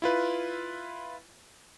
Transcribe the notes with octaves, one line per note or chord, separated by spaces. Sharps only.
E4 F4 B4